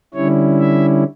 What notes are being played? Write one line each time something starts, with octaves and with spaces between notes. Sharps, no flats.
D3 G3 C#4 E4 C#5
E5